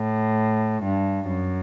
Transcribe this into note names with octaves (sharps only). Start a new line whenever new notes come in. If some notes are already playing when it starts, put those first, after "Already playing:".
Already playing: A2
G2
F#2